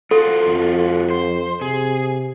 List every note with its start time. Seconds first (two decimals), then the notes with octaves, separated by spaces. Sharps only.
0.11 F4 F#4 A4 C5
0.47 F2
1.10 C5
1.61 C3 G#4